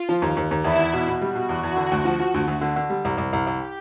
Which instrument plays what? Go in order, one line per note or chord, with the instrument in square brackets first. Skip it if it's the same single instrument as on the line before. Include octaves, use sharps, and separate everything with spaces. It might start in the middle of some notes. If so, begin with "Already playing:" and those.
Already playing: [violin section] F4
[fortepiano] F3
D#2
D#2
D#2
[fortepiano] E2 [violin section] E4
[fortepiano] E2
B2
B2
[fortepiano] G3 [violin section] F#4
[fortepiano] B2
E2
E2
D3
D2
F3
F3
D2
D2
D3
D3
G3
C2
C2
C2
[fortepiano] C2 [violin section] G4